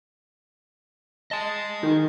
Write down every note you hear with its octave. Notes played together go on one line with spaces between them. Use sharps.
D#5 G#5 A5
D#3